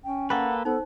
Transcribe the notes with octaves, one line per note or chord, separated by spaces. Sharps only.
C#4 G5
A#3 A4 B4 F#5 G5 C6 D6
B3 D#4 A4 C5